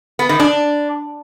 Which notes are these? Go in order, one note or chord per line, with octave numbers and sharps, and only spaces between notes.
B3
D#3
D4